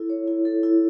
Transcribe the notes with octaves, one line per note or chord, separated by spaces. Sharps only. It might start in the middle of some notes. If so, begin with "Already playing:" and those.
Already playing: E4 A4
C#5
E4
A4
E4